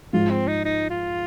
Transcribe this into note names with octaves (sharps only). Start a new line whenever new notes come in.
G#2 F3 G#3 F4
C4
D#4
D#4
F4